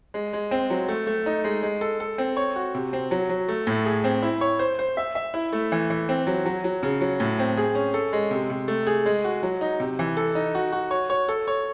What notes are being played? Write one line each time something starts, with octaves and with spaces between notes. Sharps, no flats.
G#3
G#3
C4
F#3
A3
A3
D#4
G#3
G#3
A4
A4
C4
C#5
F#4
C3
C4
F#3
F#3
A3
A2
G#4
C4
E4
C#5
C5
C5
E5
E5
E4
A3
E3
E3
C4
F#3
F#3
F#3
C#3
F#3
A2
C4
G#4
C#4
A4
G#3
C3
C3
A3
G#4
G#3
F#4
F#3
D#4
C3
E3
A4
D#4
F#4
F#4
C#5
C#5
A4
C#5